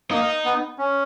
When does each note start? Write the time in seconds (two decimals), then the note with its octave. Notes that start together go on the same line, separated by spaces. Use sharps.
0.11 A#3 D#4
0.45 B3
0.78 C#4